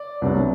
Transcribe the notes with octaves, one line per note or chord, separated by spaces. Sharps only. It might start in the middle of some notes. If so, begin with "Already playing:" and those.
Already playing: D5
C2 C3 F#3 B3 D4